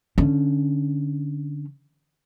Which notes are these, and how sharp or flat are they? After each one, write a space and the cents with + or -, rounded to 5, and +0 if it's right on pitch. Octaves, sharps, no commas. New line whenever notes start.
D3 +0 C#4 +0